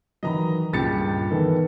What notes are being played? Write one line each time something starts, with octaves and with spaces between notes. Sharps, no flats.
D#3 E3 F#3 D#5 A#5 B5
C#2 G2 A#2 G4 A6 C#7
D#3 E3 B3 A4